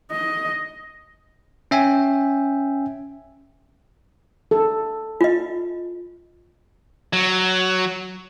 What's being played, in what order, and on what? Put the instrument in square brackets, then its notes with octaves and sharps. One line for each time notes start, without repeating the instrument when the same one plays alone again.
[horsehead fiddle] D#5
[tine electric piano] C#4 E5 G5 G#5
[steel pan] A4
[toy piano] F4 D#5
[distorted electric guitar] F#3